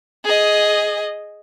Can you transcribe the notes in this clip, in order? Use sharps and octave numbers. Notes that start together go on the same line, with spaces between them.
G#4 D#5